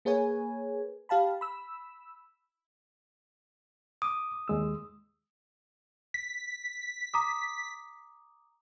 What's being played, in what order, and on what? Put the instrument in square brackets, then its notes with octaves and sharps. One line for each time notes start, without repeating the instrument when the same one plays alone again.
[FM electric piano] A#3 G#4 B4 C#5 G#5
G4 F5 A5 B5
B5 E6
[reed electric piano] D6 [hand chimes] D#6
[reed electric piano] D#2 G#3 E6
[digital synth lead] B6
[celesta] A#5 D6 D#6